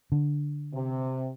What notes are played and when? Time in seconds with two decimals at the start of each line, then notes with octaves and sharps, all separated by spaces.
0.12 D3
0.73 C3